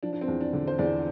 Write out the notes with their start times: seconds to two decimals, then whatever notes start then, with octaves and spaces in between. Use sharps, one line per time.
0.03 F3 D4
0.13 D4
0.21 C4
0.28 E2
0.41 D4
0.53 D3
0.67 C5
0.78 E2 D4 D5